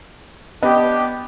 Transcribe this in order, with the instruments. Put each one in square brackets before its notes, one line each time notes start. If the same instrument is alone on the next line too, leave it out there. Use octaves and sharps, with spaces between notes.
[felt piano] B3 [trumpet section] D4 G4 [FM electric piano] D#5